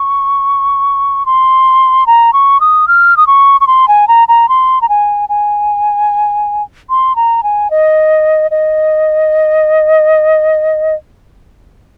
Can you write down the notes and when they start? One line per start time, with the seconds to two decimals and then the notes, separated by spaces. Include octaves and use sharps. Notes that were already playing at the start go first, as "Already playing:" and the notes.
Already playing: C#6
1.26 C6
2.06 A#5
2.33 C#6
2.60 D#6
2.88 F6
3.17 D#6
3.27 C#6
3.61 C#6
3.67 C6
3.88 G#5
4.08 A#5
4.28 A#5
4.49 C6
4.81 A#5
4.89 G#5
5.29 G#5
6.90 C6
7.16 A#5
7.43 G#5
7.70 D#5
8.51 D#5